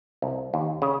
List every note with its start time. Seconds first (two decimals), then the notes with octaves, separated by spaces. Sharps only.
0.22 C2
0.54 D#2
0.82 C#3